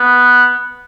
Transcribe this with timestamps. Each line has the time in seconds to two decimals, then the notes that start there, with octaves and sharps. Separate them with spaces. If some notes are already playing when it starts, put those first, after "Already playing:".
Already playing: B3